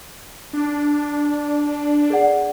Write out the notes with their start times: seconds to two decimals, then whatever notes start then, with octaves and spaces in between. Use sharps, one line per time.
0.53 D4
2.10 G#4 D5 F#5